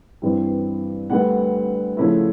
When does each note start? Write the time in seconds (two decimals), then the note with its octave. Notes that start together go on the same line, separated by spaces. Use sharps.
0.22 G2 E3 G3 C4
1.10 D2 D3 G3 B3 F#5
1.97 C#3 F3 A3 C#4 E4